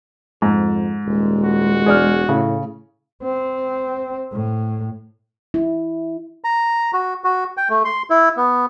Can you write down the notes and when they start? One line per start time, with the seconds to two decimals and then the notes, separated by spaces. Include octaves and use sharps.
0.42 F2 G#2
1.06 D#1 G#3
1.44 F#4
1.86 E1 G#4 D5 F6
2.29 A2 C#3
3.23 C4
4.32 A2
5.54 E4
6.44 A#5
6.93 F#4
7.24 F#4
7.57 G5
7.70 A3
7.85 C6
8.10 E4
8.37 B3